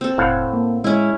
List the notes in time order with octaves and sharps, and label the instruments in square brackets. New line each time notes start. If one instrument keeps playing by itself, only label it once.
[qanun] C4 A4
[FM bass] E1 [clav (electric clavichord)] A2 F5 F#5
[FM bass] A#3
[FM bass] G#3 [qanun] C#4 E4